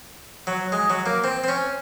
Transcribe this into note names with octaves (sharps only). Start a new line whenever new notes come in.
F#3
G#3
F#3
A#3
C4
C4
C#4